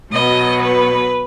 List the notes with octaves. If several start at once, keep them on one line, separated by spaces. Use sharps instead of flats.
B2 F#3 B3 D#5
B4